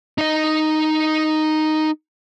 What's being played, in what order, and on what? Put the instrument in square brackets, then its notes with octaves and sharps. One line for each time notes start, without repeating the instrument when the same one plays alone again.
[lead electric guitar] D#4 D#5